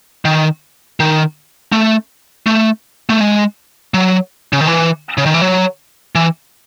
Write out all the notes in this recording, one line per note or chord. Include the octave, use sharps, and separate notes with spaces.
D#3
D#3
A3
A3
A3
G#3
F#3
C#3
D#3
E3
C#3
D#3
E3
F#3
E3